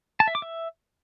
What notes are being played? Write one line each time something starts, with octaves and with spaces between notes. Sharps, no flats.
A5
E5
D6
E5